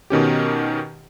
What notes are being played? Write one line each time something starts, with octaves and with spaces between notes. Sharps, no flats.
B2 D#3 C#4 G4